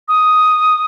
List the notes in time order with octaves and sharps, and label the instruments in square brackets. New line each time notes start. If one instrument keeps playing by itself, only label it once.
[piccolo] D#6